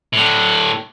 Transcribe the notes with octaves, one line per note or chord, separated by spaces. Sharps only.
A2 D3